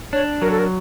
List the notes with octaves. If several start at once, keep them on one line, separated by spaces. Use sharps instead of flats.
D4 C#5
F#3 A#4
A4
A#4